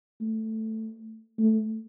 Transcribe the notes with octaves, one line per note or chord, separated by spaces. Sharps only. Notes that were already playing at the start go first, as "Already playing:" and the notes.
A3
A3